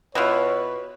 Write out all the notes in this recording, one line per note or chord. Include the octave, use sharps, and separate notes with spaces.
B2 E4 F4 B4 C#5